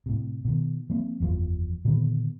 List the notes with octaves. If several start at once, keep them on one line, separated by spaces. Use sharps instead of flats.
A2 C3
B2 D#3
F3 A#3 C4
F#1 E2 C#3 F3
A#2 D3 D#3 B3